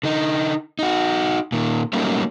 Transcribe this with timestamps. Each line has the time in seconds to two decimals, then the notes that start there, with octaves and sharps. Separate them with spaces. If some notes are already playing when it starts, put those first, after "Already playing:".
0.03 D3 D#4
0.79 D#4 F#4
1.52 A#2 D#3
1.93 F#3 G3 A3 A#3 C#4 D#4